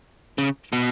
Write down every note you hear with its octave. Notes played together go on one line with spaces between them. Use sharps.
C#3
B2